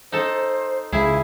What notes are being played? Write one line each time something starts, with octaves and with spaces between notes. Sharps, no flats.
D#4 A4 C5
C#2 E4 G#4